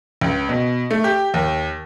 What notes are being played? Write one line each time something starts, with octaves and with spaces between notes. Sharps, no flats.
C#2
B2
A3
G4
D#2